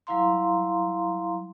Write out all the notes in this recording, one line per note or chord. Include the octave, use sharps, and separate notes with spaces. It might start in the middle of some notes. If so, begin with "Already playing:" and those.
F#3 G3 E4 F5 A#5 C6